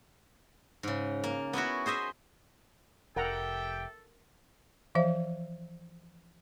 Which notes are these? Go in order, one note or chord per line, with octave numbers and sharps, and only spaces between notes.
G#2 C#3
A#3
B3 C#4 E4 F#4
G#4 C5 D#5 E5
F1 G4 A4 A#4 E5 F#5 G5 A#5
E3 F3 C5 E5 F5